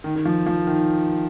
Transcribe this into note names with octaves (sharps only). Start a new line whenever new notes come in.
D#3
D#3
F3
F3
D#3